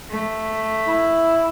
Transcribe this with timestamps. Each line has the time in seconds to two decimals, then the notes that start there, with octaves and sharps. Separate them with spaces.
0.11 A3
0.88 E4